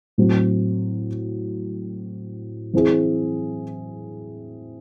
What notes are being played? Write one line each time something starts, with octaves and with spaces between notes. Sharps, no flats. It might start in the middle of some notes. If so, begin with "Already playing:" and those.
A2 F#3 C4 F#4
E3 C4 E4 G#4